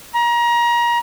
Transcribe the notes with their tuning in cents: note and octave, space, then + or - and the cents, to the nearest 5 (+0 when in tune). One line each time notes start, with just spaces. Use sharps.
A#5 +30